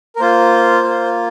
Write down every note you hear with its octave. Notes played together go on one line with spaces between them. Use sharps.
A#4
A#3 F4 C5
A#3 F4